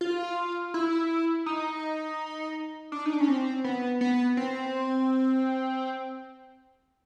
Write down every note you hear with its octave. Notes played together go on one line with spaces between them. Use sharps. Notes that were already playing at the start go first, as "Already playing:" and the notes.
F4
E4
D#4
D4
D#4
D4
C#4
C4
B3
B3
C4